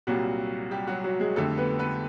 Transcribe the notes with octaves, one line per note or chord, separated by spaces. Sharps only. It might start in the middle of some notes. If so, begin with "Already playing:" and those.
C2 A#2 F#3 G3 F#4
G3 G4
F#3 F#4
F#3 F#4
G#3 G#4
F2 D3 G3 A3 A4
B3 B4
B3 B4